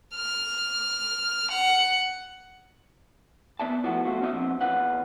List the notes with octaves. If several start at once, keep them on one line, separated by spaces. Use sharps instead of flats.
F6
F#5
B3 D5 E5 A5
E3 F3 A3 B3 F#4
B1 F2 B2 A3 F4 F#4
C#4 D#4 E4 G4 D#5 E5
A#2 F3 B3 C4
E2 C#4 F4 B4 F#5